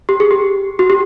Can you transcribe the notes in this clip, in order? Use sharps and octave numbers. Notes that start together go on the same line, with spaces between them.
G4
G#4
G4
F#4
G4